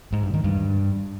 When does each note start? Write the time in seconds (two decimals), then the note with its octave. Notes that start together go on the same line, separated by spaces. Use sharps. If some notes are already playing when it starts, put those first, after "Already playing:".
0.12 G#2
0.23 G2
0.34 D#3
0.44 G2